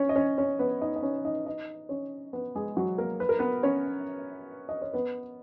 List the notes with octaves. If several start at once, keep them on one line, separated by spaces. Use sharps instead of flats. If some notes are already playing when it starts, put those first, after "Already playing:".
Already playing: C#4 C#5
D#5
C#4 C#5
C#4 C#5
B3 B4
D#4 D#5
D#5
C#4 C#5
D#4 D#5
D#4 D#5
C#4 C#5
B3 B4
G#3 G#4
F#3 F#4
A#3 A#4
B4
A#4
B3 B4
C#4 C#5
D#5
C#5
B3 B4